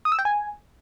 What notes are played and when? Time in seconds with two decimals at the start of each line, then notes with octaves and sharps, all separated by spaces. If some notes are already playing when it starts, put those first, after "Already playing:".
0.05 D#6
0.12 E6
0.19 G5
0.25 G#5